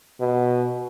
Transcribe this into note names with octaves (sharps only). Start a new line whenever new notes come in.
B2